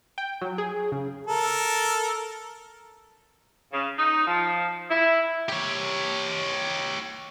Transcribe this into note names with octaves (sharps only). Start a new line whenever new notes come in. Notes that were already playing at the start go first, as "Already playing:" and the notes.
G5
F#3
G#4
C#3
A4 A#4
C#3
D#4
F3
E4
G4 C#5